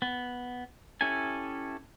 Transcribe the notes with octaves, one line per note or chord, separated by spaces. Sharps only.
B3
C#4 E4 G4 A4 G#5